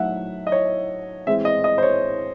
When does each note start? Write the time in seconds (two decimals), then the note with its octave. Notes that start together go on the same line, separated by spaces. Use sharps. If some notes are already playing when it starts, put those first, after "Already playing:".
Already playing: F#3 A3 D#4 E5 F#5
0.47 D#5
0.52 C#5
1.27 A2 E3 G#3 C4 E5
1.45 D#5
1.64 D#5
1.78 C5
1.83 C#5